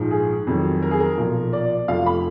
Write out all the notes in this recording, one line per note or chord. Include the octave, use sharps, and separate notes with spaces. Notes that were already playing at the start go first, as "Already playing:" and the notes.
Already playing: A#1 G#2 F3
G#4
F2 D#3 F#3
A#4
G#4
A#4
B1 A#2 F3
D5
F1 F2 F3 F5
B5